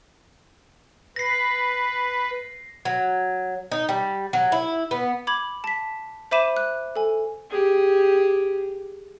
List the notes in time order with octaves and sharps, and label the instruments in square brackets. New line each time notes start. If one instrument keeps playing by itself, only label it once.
[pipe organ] B4 [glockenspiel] A#6 C7
[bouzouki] F#3
D#4
G3
F#3
E4
B3
[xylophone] B5 D6 G#6 F#7
A5 B6
C5 E5 B5 D6 D#7 E7
F#6
A4 G#5
[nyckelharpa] G4 G#4